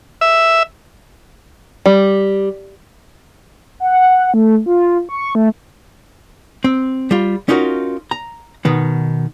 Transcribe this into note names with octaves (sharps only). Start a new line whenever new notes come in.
E5
G3
F#5
A3
F4
C#6
A3
C4
G3 F4
C#4 D#4 F4 F#4 A#4
A#5
B2 D#3 B3